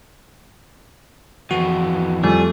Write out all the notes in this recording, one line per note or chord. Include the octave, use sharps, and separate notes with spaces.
F2 E3 F#4
F2 G3 A3 G#4